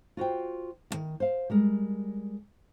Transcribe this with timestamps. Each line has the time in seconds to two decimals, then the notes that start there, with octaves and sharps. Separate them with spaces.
0.17 F4 F#4 C5 G5
0.91 D2 D#3
1.20 C5 F5
1.50 G3 G#3 A#4